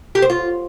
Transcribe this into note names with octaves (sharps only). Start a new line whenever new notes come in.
G4
C5
F4